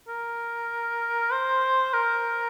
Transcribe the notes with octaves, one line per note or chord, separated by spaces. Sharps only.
A#4
C5
A#4